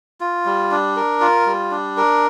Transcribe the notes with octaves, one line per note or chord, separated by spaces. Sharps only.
F4
G3
D4
A#4
F4
G3
D4
A#4